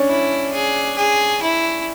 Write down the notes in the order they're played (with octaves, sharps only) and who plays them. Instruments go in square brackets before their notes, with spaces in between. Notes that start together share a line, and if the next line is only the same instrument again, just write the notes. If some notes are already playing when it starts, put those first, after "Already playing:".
Already playing: [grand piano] C#4 D4
[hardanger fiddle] E4
G#4
G#4
E4